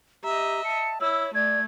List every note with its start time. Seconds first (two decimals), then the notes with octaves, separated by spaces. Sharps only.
0.24 G4 D#5 E5 A#5
0.64 A5 C#7
1.01 E4 C#5 E6
1.35 A3 D5 G#6